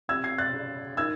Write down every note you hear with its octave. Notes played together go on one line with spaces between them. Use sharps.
C3 E6 G#6
G#6 C7
F#6 A6
C#3
D#3 E6 G#6